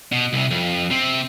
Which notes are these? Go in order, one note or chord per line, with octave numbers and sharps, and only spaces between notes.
B2
C2 C3
F2
C3 C4